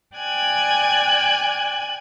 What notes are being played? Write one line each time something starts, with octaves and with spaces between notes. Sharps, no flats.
D5 G5 G#5 F#6 G#6